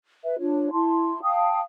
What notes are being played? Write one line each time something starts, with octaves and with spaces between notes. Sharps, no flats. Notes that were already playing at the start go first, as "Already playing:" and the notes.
B4 E5
D4 F4 C#5
E4 A5 C6
F5 G5 A5 D#6